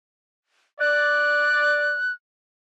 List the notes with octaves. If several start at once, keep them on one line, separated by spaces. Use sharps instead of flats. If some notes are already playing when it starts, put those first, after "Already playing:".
D5 F#6